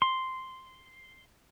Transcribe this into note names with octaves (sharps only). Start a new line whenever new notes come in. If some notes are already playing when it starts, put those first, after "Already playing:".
C6